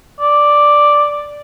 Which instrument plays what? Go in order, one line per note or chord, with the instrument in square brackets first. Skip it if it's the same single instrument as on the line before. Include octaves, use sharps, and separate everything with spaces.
[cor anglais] D5